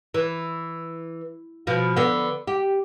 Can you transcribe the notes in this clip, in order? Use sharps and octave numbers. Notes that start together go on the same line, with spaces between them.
E3
B2 F3
D3 B3
G4